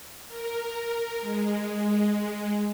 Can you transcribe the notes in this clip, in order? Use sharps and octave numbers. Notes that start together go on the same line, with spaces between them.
A#4
G#3